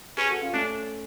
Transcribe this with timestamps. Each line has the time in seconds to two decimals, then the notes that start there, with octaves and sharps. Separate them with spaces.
0.17 C#4 G#4 B4
0.29 F#4 A4
0.41 C#4 F4
0.53 A3 C#4 D4